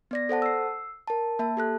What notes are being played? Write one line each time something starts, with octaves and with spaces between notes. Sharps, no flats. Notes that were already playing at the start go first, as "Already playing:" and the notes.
B3 D5 A#6
A4 C5 F#5 A5
E6 C7
A#4 A5
A#3 E5 A5
G4 A4 F#6